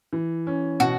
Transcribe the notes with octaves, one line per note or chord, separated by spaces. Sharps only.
E3
C#4
B2 F#4